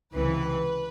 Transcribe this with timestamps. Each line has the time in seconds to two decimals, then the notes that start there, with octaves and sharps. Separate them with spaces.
0.14 C#2 C3 E3 B4